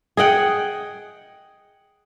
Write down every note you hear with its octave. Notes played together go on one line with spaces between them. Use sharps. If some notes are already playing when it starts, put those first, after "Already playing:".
G#4 D#5 F#5 G5